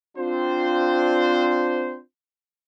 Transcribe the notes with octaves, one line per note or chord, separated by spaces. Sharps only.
C4 D4 F4 C5